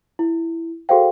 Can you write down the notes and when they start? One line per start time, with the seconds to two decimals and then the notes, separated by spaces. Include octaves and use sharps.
0.19 E4
0.89 F#4 G#4 A4 C5 F5 G5